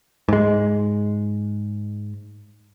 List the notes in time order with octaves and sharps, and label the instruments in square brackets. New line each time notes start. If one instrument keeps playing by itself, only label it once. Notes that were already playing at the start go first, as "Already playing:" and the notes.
[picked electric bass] G#2 G#3